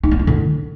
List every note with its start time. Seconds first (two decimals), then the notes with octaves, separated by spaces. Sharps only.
0.03 D#4
0.11 B3
0.19 E4
0.27 D3